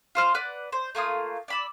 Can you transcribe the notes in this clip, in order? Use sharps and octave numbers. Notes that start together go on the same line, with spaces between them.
F4 C5 F6
B4 D5 F#5
C5
A3 A#3 F4 D#6
D5 B5 E6